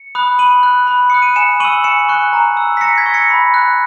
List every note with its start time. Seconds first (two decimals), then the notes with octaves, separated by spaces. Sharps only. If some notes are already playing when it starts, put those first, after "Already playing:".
Already playing: C#7
0.15 B5 D#6 F#6
0.39 B5 D#7 F#7
0.63 F#6
0.87 B5
1.10 D#6 F#6 C#7
1.22 D#7
1.36 G#5 C#7 E7
1.60 C#6 E6 D#7 F#7
1.84 G#5 C#7 E7
2.09 C#6 F#6
2.33 A#5
2.57 E6
2.77 B6
2.81 A#5 A#6 C#7
2.98 G#6 B6
3.06 C#6 E6
3.14 A#6 C#7
3.30 B5
3.54 F#6